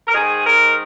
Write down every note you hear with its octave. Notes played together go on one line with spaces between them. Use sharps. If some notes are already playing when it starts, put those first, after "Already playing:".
A#4
G#2 D#3 G#4
A#4